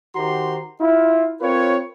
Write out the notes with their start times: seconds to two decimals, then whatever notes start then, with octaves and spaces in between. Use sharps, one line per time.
0.16 D#3 F#4 G4 C5 A#5 C6
0.81 E4 F4
1.41 C4 F4 A#4 B4 C#5